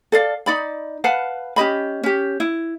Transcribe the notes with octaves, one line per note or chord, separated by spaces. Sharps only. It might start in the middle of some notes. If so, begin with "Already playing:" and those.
A4 D5 F5
D#4 D5 B5
B4 F5 F#5 A5
C#4 G4 D#5 B5
C#4 G4
E4